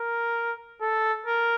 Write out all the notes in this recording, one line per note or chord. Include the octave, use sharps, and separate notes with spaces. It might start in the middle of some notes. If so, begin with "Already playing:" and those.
Already playing: A#4
A4
A#4